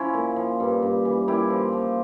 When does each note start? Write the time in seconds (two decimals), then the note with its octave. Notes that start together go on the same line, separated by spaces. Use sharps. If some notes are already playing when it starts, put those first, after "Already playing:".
Already playing: F3 C#4 E4
0.14 A#2
0.36 F3
0.60 G2
0.82 G2
1.05 E3
1.28 A#2 E4 G4
1.50 F3
1.73 F3